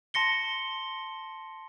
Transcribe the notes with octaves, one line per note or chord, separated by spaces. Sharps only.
A5 C6 A#6 C#7 G7